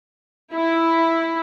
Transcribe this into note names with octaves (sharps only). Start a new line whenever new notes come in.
E4